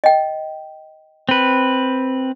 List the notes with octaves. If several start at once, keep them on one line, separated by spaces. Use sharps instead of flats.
D#5 G5
C4 B4